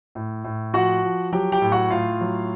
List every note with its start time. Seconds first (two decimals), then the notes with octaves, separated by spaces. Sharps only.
0.15 A2
0.44 A2
0.74 F3 F#4 F#5
1.03 F3
1.32 F#3 G4 G5
1.52 G4 G5
1.61 A2
1.72 F#4 F#5
1.90 A2 F4 F5
2.21 F#3